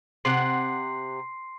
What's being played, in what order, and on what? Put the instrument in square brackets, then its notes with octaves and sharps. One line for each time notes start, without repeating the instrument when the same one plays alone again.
[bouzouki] C3 F#5 [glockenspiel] C6 C7